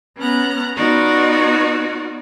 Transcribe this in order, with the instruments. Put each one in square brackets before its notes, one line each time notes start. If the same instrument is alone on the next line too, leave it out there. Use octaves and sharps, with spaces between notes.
[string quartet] B3 C#4 A#5 F#6
B3 D#4 F4 F#4 D5